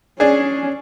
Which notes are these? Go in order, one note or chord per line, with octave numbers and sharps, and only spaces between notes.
C#4 D4 G#4